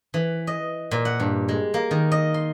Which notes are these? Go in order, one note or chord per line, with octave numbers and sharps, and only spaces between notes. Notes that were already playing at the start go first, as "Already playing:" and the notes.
E3
D#5
A#2
F#5
G2
G#3
A#3
D#3
D#5
C6